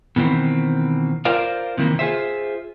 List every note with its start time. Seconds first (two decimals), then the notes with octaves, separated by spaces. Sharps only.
0.16 B2 D#3 E3 C4
1.25 F4 A#4 C5 D5 F5
1.77 C3 D#3 E3 A#3
1.99 F4 G#4 C5 E5